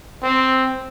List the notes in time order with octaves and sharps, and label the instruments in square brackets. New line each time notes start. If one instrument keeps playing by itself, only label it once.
[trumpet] C4